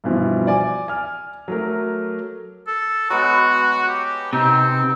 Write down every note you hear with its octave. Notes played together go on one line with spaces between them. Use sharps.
G2 B2 E3 F3
D5 G#5 D6
G#5 F6
F#3 A3 A#4
A4
F#3 G#3 B3 F#4
G4
C3 C4 D#4